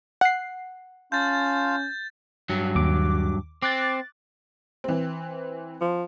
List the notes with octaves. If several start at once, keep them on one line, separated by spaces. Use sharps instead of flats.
F#5 C7
C#4 F4 F5 A5 G6 A6
G2 F#3
D#2 D6
C4 D6 F#6 A6
E3 C4
F3